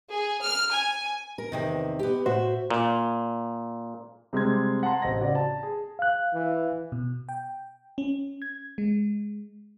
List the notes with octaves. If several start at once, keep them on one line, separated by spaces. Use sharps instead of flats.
G#4
F6
G#5
A#4
E2 C3 D#3
B3 G4
A2 F#4 C5 E5
A#2
C3 G3 G#3 C4 C6 G#6
F#5 A5 A#5 C6
A1 C4 D#5 A#6
C#3 F#4 D5
A5
G#4 A5
F5 F#6
E3
B2
G5
C#4
G#6
G#3